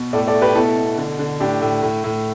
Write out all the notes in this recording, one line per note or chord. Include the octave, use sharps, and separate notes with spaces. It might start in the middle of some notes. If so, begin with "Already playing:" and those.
Already playing: B2
A2 A4 D5
A4 D5
A3
G4 B4
B2 E4 A4
B2
D3
D3
A2 D4 G4
A2
A2
A2